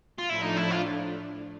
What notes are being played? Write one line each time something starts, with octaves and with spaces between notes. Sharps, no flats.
F4
A2 F3 A3 D4 E4
D#4
E4
F4